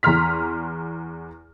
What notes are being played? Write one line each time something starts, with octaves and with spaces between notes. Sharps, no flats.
E2 A#5 C6 F6 B6